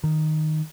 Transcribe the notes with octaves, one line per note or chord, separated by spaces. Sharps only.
D#3